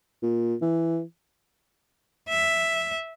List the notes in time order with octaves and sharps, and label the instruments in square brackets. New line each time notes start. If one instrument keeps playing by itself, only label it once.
[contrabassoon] A#2
E3
[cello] E5